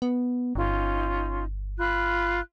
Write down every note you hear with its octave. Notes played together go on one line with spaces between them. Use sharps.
B3
G1 C#4 D#4 F4
F4 B5 F#6